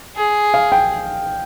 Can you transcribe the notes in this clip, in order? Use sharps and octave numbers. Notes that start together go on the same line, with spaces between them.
G#4
F5
G5